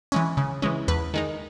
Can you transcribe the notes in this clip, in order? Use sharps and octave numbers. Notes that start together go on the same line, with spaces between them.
E3 G#3 C#4
C#3
E3 G#3 C#4
E2 B4
D#3 G#3 D#4